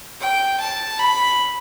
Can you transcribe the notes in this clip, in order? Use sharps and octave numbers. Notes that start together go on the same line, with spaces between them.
G5
A5
B5